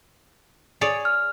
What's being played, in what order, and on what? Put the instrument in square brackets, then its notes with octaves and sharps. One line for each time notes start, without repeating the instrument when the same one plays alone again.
[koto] G#4 C#5 D5
[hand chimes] F6